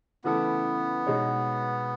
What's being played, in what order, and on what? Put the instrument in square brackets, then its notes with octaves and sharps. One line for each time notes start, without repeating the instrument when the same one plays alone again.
[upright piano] C#3 E3 A3 E4 A4 [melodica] B3
[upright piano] B2 G#3 D#4 G#4 C#5